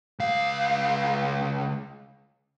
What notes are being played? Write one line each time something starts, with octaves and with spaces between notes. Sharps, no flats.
C#2 F5